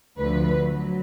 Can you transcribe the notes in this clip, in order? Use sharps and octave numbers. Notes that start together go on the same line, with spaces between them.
D2 D3 F3 B4
F#3